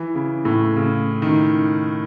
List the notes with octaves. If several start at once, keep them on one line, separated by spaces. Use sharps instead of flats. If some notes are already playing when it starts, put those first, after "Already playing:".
Already playing: E3
C#3
A2
C#3
D#3